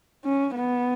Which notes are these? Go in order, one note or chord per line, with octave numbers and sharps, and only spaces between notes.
C#4
B3